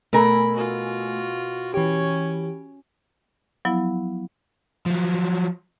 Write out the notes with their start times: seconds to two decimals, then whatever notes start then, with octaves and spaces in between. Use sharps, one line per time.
0.13 B2 A3 A#4 G#5 B5
0.55 F4 F#4
1.74 E3 C#4 G4 C#5
3.65 F3 F#3 B3 E4
4.86 F3 F#3